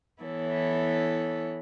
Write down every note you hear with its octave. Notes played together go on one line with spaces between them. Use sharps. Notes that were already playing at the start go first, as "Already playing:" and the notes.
E3 B3 E4 A4 C#5